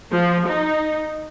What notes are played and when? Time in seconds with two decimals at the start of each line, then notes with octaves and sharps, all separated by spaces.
0.11 F3
0.47 D#4